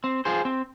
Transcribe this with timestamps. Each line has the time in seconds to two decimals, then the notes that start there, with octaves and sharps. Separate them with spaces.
0.04 C4
0.25 F4 G#4 C5
0.45 C4